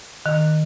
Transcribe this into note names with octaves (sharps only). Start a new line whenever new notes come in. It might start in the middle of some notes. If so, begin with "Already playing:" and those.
D#3